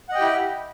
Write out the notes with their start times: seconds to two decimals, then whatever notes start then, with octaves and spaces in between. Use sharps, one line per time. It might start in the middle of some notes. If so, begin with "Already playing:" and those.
0.09 F#5
0.12 D#5
0.15 G5
0.18 G4
0.21 E4